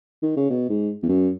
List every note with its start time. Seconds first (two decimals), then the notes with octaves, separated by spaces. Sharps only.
0.22 D#3
0.37 C#3
0.50 B2
0.69 G#2
1.03 E2
1.09 F#2